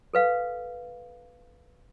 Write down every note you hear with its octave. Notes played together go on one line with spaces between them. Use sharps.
A4 B4 F5